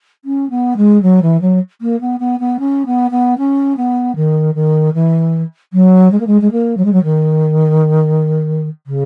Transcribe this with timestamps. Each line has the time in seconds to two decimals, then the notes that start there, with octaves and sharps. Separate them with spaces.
0.24 C#4
0.50 B3
0.77 G#3
1.02 F#3
1.22 E3
1.41 F#3
1.81 A#3
2.01 B3
2.20 B3
2.39 B3
2.59 C#4
2.86 B3
3.11 B3
3.38 C#4
3.77 B3
4.16 D#3
4.54 D#3
4.94 E3
5.73 F#3
6.11 G#3
6.19 A#3
6.27 G#3
6.41 G#3
6.51 A#3
6.77 F#3
6.84 G#3
6.92 F#3
7.03 D#3
8.86 C#3